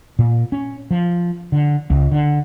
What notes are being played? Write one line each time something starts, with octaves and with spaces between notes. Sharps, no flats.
A#2
C#4
F3
D3
C#2
D3